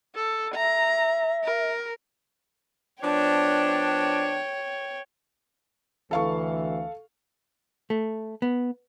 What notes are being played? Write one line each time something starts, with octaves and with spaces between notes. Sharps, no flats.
A4
E5 A#5
A#4
F3 B3 D4 C#5 G5
D2 E3 A4 F5 C#6
A3
B3